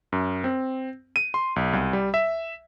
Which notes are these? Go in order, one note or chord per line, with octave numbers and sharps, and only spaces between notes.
F#2
C4
D#7
C6
B1
C2
G3
E5